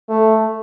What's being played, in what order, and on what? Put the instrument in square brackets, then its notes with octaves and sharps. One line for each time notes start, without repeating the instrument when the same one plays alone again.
[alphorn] A3